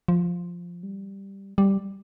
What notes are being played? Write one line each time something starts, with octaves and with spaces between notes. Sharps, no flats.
F3
G3
G3